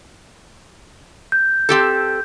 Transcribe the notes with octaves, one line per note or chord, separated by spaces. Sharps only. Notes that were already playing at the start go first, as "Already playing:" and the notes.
G6
C4 G4 A4